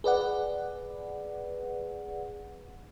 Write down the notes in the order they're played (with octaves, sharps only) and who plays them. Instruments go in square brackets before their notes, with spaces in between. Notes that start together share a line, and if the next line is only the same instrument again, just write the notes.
[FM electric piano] G#4 B4 D5 F#5